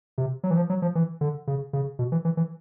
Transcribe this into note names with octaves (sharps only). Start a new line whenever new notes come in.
C3
F#3
E3
F3
F#3
F3
E3
D3
C#3
C#3
B2
E3
E3
E3